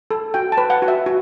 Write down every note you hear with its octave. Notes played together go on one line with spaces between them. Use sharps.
A4
F#4 G5
A5
B4
F#5
F#4
E5
F#4